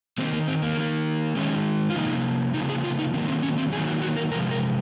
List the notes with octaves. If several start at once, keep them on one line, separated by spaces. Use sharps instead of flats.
D#3 A#3 C4
A#3
C4
A#3
D#3 A#3
D#3 G#3 C#4
F4
C3 F3 A#3 D#4
C#3 F3 A#3 D#4
G#4
F4
D#4
D#3 F#3 A#3 C4
C4
C#4
C4
D#3 F#3 A#3 G#4
F#4
F#4
A#4
C3 F3 G#3 A#4
A#4